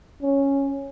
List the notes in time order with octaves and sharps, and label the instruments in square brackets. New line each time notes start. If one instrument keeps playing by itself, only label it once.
[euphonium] C#4